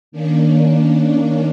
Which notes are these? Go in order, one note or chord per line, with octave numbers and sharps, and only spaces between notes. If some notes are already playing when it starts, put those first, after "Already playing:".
D#3 A#3 C#4 D4